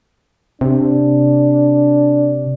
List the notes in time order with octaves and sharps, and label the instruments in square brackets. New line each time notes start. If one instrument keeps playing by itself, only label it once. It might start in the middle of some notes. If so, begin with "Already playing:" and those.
[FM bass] C3 [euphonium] D4